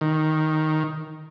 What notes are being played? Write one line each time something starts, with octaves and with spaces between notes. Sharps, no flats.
D#3